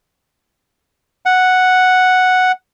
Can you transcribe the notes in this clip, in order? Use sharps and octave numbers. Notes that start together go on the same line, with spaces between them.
F#5